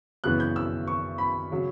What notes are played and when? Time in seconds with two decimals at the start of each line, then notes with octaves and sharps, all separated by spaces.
0.24 F#2 C#3 E3 B3 F#6
0.40 G6
0.56 E6
0.87 C#6
1.18 B5
1.52 C#3 F#3